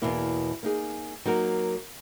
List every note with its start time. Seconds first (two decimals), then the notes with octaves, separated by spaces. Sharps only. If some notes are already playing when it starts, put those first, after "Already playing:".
0.02 E2 B2 A#3 E4
0.63 A#3 D#4 G#4
1.25 F#3 A#3 D#4 F#4 A#4